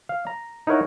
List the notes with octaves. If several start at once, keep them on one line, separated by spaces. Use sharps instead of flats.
F5
A#5
D#4 E4 A#4 C#5 F#5